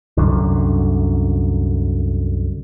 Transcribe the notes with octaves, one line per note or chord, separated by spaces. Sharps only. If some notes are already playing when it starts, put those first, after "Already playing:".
C2 F#2 D3